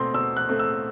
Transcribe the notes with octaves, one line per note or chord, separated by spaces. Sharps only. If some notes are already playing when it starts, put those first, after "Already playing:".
Already playing: B2 A3 C4 C6
B2 E6
F#6
A3 C4
E6